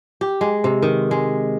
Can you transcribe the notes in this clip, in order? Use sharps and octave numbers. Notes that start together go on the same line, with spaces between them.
G4
G#3
C3
D#3
G#3